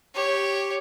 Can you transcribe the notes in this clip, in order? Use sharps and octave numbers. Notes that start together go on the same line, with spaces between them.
G4 C#5